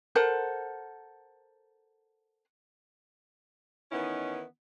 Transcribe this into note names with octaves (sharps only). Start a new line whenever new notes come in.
A4 A#4 C5 F#5
D#3 E3 B3 C#4 D#4 E4